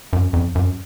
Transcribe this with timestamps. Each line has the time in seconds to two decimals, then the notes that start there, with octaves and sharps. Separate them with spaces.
0.13 F#2
0.33 F2
0.55 F#2